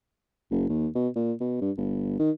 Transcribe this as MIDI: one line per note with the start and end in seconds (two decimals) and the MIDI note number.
0.51 0.68 30
0.69 0.88 39
0.95 1.08 47
1.16 1.33 46
1.41 1.58 47
1.61 1.71 43
1.78 2.16 31
2.20 2.31 51